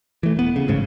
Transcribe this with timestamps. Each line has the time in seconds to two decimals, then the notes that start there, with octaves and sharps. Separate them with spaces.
0.23 E3 A3
0.37 D#1 B3
0.56 C#3
0.68 A1 G#2 C#3